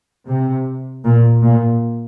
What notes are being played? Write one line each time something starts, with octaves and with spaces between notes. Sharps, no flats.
C3
A#2
A#2